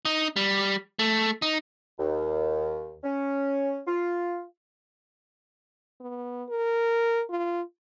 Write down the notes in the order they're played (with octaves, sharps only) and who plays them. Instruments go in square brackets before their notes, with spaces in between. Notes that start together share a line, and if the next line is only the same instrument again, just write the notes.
[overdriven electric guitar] D#4
G3
A3
D#4
[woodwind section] D#2
C#4
F4
[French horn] B3
A#4
F4